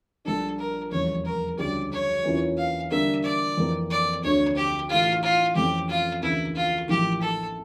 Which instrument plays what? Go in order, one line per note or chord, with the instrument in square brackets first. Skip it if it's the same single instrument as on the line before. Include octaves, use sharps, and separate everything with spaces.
[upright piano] A#1 A#2 G3 D4 [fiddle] A4
[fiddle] A#4
[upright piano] F1 E2 C#3 G3 A#3 [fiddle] C#5
[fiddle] A#4
[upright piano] D2 C#3 G3 C#4 G4 [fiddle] D5
[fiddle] C#5
[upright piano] E2 E3 A#3 C#4 F4
[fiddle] F5
[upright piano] D3 G3 A#3 D4 [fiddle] E5
[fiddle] D5
[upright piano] F2 E3 A#3
[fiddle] D5
[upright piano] D2 D3 A3 D4 [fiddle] C#5
[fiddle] G4
[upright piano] A2 E3 A3 E4 G4 [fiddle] F4
[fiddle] F4
[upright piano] F2 E3 A3 C#4 [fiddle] G4
[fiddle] F4
[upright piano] D2 C#3 E3 A#3 [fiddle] E4
[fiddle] F4
[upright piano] A1 A2 F3 A#3 E4 [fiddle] G4
[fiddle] A4